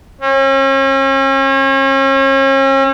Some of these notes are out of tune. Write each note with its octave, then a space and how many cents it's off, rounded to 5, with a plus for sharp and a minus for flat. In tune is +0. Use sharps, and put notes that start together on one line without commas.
C#4 -40